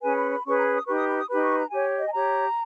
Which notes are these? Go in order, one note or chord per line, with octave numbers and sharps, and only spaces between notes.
C#4 G#4 B4 G#5
B5
B5
C#4 G#4 B4 C#6
A#5
B5
D#6
D#4 G4 B4 C#6
D#6
B5
D#6
D#4 G4 B4 B5
C#6
A#5
G4 C#5 G#5
D#5
G#5
G4 C#5 A#5